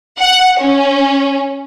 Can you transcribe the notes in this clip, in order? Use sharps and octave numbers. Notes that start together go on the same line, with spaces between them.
F#5
C#4